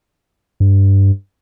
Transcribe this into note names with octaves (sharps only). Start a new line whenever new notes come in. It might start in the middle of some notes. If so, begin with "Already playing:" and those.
G2